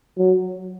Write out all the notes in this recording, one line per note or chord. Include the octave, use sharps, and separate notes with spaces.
F#3